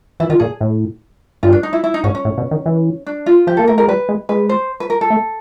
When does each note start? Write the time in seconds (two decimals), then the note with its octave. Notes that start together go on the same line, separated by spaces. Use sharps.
0.20 E3 E4
0.30 D#3 F4
0.40 A#2 G#4
0.61 A2
1.43 G2 F4
1.53 D4
1.63 D#4
1.73 E4
1.84 E4
1.94 D#4
2.04 G#2 C#4
2.15 C#4
2.25 A2
2.37 B2
2.51 D#3
2.66 E3
3.07 D4
3.26 F4
3.47 F3 G4
3.57 A#3 A4
3.68 A3 A#4
3.78 G#3 A#4
3.88 G3 B4
4.09 G#3
4.29 G#3 B4
4.49 C5
4.80 B4
4.90 A#4
5.01 A4
5.10 A3